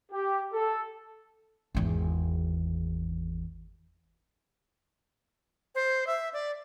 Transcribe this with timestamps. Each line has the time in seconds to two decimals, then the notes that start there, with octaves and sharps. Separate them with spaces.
0.12 G4
0.53 A4
1.75 G#1 E2
5.75 C5
6.07 E5
6.33 D5